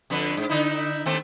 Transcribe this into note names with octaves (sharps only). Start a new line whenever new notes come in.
F2 D3 B4
G#2
D3 D#4 E4
D#2 A3 C4